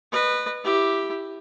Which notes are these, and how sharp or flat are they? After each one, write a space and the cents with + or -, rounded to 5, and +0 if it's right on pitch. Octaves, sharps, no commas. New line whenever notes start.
B4 +0 D#5 -30
E4 +0 G4 +0